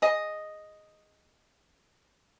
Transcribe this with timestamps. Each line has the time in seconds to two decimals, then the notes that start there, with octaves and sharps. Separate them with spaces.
0.02 G#4 D#5